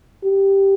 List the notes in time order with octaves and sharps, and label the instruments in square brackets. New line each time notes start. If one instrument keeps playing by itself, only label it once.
[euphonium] G4